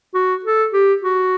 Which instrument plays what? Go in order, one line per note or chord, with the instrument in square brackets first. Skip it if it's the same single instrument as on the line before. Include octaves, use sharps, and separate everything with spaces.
[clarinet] F#4
A4
G4
F#4